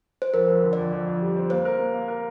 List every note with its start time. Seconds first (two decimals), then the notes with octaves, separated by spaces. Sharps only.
0.22 C5
0.34 F2 A#4
0.48 F2
0.63 D3
0.73 F2 D5
0.92 F2
1.07 F2
1.21 G3
1.36 C4
1.50 A#3 C5
1.65 A#4
1.79 A#3
1.94 A#3
2.08 A#4